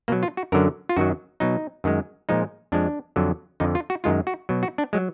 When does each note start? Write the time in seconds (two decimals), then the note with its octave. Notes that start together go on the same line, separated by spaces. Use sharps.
0.08 B2 F#3 A#3
0.23 F4
0.37 F#4
0.52 F#2 D3 F#3 A#4
0.89 F4
0.97 F#2 D#3 F#3 F#4
1.40 B2 F#3 D#4
1.84 F#2 D#3 G#3
2.29 A#2 F3 G#3 D#4
2.72 F2 F3 G#3 D4
3.16 F2 D3 F#3
3.60 F2 D3 F3 D#4
3.75 F4
3.90 F#4
4.04 F#2 D#3 G#3 F4
4.27 F#4
4.49 B2 F#3
4.63 F#4
4.78 D4
4.93 F#3 G#3